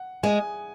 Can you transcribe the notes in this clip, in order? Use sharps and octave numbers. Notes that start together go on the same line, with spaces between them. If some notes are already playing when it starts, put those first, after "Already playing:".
Already playing: F#5
G#3 G#5